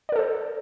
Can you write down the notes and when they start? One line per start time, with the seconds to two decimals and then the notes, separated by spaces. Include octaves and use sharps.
0.09 D5
0.12 A#4
0.16 A4
0.19 C5